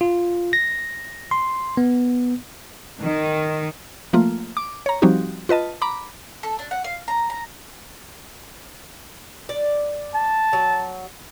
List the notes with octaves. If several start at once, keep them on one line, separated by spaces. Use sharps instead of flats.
F4
A#6
C6
B3
D#3
F3 A3 A#3 F4
D6
C#5 A#5
F3 G3 C4 D#4 F#4 G4
F4 B4 D#5 A5
A#5 B5 D6
A4
D4
F#5
F5
A#5
A#5
D5
A5
F#3